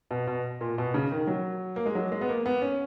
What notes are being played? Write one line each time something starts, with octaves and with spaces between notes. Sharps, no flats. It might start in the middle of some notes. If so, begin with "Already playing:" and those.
B2
B2
A#2
B2
C#3
D#3
F#3
A#3
G#3
F#3
G#3
B3
A#3
B3
C#4